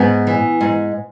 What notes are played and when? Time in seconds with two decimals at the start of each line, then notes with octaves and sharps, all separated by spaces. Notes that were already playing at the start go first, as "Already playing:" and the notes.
Already playing: G#2 B3
0.27 E3
0.61 G#2